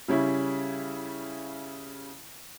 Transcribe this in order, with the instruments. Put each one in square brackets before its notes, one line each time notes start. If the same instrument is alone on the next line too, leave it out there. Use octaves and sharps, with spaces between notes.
[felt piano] C#3 G3 C#4 E4